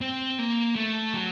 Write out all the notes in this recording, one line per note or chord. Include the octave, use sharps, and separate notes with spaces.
C4
A#3
A3
F#3